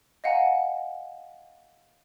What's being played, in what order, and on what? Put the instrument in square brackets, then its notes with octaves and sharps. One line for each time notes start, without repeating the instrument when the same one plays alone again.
[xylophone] D#5 F5 F#5 G#5 A#5